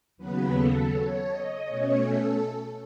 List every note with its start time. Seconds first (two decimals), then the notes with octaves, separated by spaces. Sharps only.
0.17 D#2 C#3 F#3 B3 B4
0.54 A4
0.92 C#5
1.28 D#5
1.66 B2 A3 C#4 C#5
2.04 A4